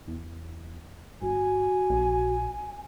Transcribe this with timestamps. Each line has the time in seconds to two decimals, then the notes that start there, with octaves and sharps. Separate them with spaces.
0.08 E2
1.22 G1 F#4 G#5
1.90 A#1